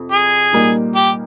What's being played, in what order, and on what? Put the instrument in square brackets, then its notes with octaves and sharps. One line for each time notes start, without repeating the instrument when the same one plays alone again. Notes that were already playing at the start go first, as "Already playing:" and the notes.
Already playing: [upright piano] F2 C3
[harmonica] G#4
[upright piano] A#2 G3 A#3 D#4
[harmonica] G4